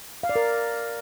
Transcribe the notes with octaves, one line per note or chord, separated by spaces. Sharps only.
F5
D5
A#4